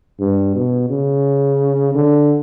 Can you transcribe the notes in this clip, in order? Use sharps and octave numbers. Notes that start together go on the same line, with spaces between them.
G2
B2
C#3
D3